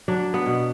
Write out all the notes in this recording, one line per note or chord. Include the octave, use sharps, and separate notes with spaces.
F#3 D4
B3
B2